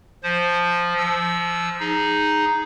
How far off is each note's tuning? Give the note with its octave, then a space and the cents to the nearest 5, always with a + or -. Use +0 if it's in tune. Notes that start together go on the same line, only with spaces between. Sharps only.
F3 +0 C5 +0
F3 -15 E6 +0
D#4 +0 G#4 -5